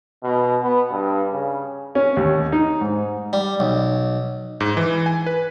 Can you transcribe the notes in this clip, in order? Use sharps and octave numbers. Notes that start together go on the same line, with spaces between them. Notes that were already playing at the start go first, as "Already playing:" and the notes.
B2
B3
G2
C#3
C#4
D#2
D#4
G#2
G3
B1
G#2
E3
G#5
B4